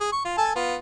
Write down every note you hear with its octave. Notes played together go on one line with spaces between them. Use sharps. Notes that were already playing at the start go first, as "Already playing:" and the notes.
G#4
C#6
F4
A4 G#5 A5
B3 F4